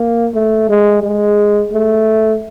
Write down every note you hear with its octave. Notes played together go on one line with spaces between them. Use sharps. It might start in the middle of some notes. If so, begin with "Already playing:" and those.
Already playing: A#3
A3
G#3
G#3
A3